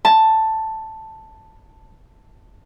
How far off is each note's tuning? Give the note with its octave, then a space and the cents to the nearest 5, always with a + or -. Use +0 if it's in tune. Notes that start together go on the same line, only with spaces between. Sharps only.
A5 +5